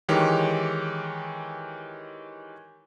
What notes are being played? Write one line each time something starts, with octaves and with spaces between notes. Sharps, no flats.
D#3 E3 G#3 G4 C#5